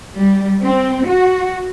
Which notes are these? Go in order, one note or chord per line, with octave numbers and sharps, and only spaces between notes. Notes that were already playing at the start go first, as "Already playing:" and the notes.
G3
C4
F#4